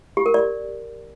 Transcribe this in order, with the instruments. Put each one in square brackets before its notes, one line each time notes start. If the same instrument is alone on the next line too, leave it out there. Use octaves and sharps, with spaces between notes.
[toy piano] G4
A#4
D5